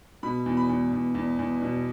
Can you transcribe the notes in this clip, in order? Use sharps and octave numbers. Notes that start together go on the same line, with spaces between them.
B2 B5
E2
B5
E2
E2
E2
E2
B2